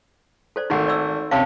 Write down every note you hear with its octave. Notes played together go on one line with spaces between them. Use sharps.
A4 C5 D5
G#1 A3 D#4 A#4 F#5
D5 E6
C3 C#4 F5 A5